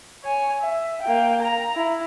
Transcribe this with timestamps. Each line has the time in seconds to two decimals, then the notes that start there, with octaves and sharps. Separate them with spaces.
0.24 C#5 G#5
0.61 E5
1.02 A#3 G5
1.42 A#5
1.76 E4